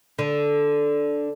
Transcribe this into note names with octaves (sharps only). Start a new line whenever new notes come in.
D3